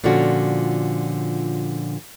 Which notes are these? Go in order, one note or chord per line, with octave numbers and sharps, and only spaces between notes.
A#2 D3 F3 C#4 F#4